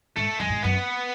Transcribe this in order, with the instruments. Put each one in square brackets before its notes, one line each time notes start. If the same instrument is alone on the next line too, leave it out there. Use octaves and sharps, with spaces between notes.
[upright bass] G#2 [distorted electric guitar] A3
[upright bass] F#2 [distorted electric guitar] G#3
[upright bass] A2
G#2
[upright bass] F#2 [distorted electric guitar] B3